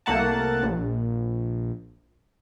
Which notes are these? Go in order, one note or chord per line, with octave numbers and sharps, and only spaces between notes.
C2 A3 A#3 F#5 A5
A#1